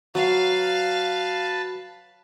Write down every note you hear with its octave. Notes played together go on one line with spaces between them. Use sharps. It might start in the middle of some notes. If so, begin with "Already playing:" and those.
F#3 F#4 B4 F5 A5